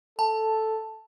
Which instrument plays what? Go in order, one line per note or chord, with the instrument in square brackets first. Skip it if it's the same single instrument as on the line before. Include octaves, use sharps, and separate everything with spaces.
[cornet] A4 [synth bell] A5